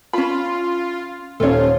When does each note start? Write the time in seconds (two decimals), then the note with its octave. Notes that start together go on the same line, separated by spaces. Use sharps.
0.13 C#4 F4 B5
1.40 D#1 C#4 F4 A4 C#5